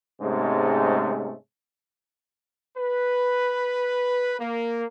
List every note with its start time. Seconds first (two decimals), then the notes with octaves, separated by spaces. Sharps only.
0.21 G#2 C3 G#3 A3 C#4
2.77 B4
4.39 A#3